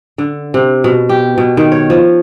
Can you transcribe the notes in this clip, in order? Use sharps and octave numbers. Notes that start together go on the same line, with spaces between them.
D3
C3
B2
G4
B2
D#3
C#5
F3